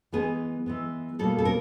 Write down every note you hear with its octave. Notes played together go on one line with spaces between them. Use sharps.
E3 G#3 B3 G#4
E3 G#3 B3
B2 G3 A#3 A4
A4
A#4